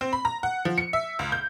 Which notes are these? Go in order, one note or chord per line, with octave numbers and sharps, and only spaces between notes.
C4
B5
A#5
F#5
F3
C#7
E5
C#2
G6